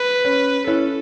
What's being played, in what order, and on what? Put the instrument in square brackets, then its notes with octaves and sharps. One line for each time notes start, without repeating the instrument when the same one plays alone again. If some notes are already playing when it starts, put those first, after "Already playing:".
Already playing: [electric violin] B4
[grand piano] C#4
[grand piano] C#4 E4 [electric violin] A4